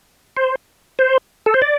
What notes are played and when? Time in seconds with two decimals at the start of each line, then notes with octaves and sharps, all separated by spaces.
0.37 C5
0.99 C5
1.46 A4
1.54 C5
1.62 D5